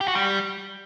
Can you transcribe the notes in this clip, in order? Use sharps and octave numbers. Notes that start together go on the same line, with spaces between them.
G4
F#4
G3